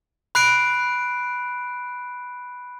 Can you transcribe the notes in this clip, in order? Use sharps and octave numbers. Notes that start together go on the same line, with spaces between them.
B5 F#6 C7 D7